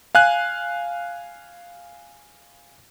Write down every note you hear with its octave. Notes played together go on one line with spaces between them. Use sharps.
F5 G#5 F#6